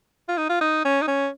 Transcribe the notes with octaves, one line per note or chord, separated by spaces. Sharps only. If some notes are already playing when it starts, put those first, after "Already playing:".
F4
D#4
F4
D#4
C#4
D#4
C#4